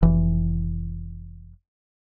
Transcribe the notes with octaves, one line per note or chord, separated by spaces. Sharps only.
F1 E3